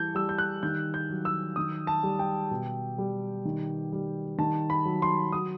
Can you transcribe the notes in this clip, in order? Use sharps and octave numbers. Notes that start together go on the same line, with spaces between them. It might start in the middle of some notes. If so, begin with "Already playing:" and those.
Already playing: E3 G3 A5 G6
G3 E6
G6
F#6
D#3 G6
G6
F#3
E6
D#3 D#6
A5
G3
G5
B2
G3
D#3
G3
D#3 A5
B5
F#3
C6
F#3 D#6